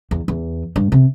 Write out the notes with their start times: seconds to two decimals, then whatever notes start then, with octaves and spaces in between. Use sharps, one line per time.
0.11 E2
0.28 E2
0.76 G2
0.92 C3